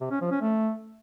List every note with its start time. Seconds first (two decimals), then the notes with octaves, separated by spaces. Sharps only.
0.01 C3
0.11 C#4
0.21 F3
0.31 C#4
0.41 A3